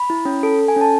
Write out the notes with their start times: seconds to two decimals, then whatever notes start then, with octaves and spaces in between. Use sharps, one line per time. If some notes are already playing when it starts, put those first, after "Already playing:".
Already playing: B5
0.10 E4
0.25 C#4
0.43 A4
0.59 A4
0.68 G#5
0.76 C#4 A5